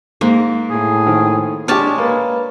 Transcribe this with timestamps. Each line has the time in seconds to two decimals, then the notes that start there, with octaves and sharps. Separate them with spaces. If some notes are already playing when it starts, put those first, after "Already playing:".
0.21 G#2 A#3
0.71 A2 G#4
1.07 D#3 F3
1.68 G#3 D4 G4 C#5 D5 A5 F6
1.98 A#3 B4